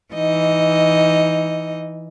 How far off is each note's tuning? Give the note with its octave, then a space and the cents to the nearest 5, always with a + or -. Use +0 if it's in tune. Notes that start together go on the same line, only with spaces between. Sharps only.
E3 +0 D#4 +15 D#5 +0